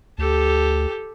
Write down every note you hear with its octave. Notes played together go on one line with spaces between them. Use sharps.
D2 G4 A4